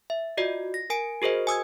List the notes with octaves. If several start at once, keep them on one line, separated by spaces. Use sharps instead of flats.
E5
F4 F#4 D5 D#5
A#6
A#4 G#5 D7
F#4 G#4 A#4 C5 D#5
G#5 D#6 E6 G#6